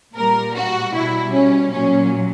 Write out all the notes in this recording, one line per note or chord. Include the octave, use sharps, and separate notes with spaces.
A#2 G3 A#4
F#4
B2 G3 E4
C#4
A#2 F#3 C#4